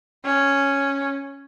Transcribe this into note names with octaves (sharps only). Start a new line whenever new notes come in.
C#4